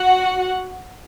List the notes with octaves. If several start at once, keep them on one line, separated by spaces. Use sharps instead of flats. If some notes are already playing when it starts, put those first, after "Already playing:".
Already playing: F#4 F#5